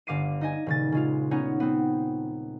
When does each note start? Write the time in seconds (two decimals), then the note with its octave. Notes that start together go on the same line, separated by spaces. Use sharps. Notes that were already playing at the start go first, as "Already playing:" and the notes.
0.07 G1 F5 D6 C7 D#7
0.41 D#4 D#5 G#5
0.66 D#1 C#3 A6
0.92 C#3 G#3 F4
1.31 B3 C#4 D#4 C#5
1.60 B3 C4